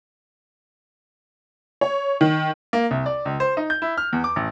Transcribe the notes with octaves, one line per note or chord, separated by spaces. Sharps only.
C#5
D#3
A#3
C2
D5
C#2
C5
D#4
G6
E4
F6
E2
D6
A1